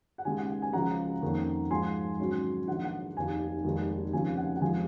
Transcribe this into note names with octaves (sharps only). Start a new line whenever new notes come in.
F#5
D#2 C#3 G#3 G#5
F#5
F#5
G#5
C#2 C#3 F3 G#3 C#4 F#5 A#5
F2 D#3 A#3 C#4
G#2 F3 G#3 G#5 C6
G#1 G#2 F#3 C#4
A#1 G#2 D#3 F#5
F#5
F1 D#2 D#3 G#5
F1 D#2 D#3 G#3
F1 D#2 C#3 F3 C4 G#5
F#5
F#5
F1 F2 C3 F3 G#3 G#5